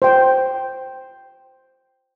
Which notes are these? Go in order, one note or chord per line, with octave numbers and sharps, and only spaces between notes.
C5 G5